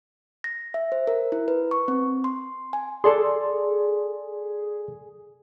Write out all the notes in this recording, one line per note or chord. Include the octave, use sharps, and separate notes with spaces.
A#6
E5
C5
A#4
E4
B4
C#6
C4
C6
G#5
G#4 A4 D5 C6